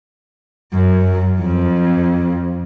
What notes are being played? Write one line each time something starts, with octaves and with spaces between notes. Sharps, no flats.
F#2
F2